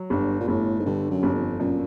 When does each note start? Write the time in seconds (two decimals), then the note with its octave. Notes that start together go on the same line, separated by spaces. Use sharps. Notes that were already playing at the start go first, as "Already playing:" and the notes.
Already playing: F#3
0.10 G1 G2
0.40 A#2
0.48 G1 A2
0.80 G#2
0.85 G2 D3
1.11 F#2
1.23 G1
1.35 F2
1.60 F#2 A#2